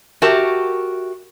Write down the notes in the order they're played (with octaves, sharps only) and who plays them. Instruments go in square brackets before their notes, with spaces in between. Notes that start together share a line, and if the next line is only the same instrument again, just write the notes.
[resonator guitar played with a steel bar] F#4 G4 A#4 E5 A5